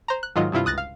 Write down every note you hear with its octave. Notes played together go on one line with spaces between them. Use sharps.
C5 A#5
F#6
G#2 D#3 F#3 F4 D#5
G2 C3 E4 F4
C#2 D#6 F#6 A6 A#6
F5